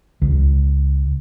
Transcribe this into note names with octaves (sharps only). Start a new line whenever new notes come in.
C#2